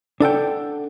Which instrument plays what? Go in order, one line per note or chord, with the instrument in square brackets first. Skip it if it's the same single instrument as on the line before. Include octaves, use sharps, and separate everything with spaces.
[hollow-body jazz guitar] D4 A4 F#5 G5